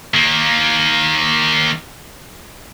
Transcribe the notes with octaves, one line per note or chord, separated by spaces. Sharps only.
D#3 A#3